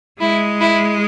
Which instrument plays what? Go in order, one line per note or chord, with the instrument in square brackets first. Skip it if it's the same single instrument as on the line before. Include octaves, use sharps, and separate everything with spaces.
[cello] G#3 [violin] E4
[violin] E4